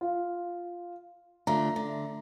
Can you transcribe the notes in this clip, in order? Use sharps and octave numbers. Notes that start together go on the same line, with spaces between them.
F4
D3 A3 F4 A#5
D3